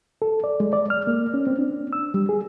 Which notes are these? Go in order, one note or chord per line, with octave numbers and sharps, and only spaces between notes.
A4
D5
G#3
D5
F6
A#3
C#4
C4
D4
E6
G3
G#4